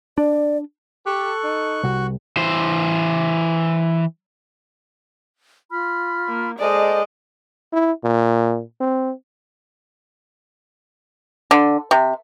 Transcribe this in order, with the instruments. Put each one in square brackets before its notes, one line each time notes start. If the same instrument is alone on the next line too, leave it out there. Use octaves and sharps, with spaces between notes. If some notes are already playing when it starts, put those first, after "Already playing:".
[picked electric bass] D4 [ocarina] D5
[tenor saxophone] G4 [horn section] A4 [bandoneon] C#6 F#6
[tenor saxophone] D#4
[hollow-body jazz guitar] C2 [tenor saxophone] F#4
[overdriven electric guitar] E3 C5
[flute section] F4 B5 F6
[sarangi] A#3
[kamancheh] G#3 D5 [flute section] A4 C5 A5 [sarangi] D#5
[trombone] E4
A#2
C4
[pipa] D3
C3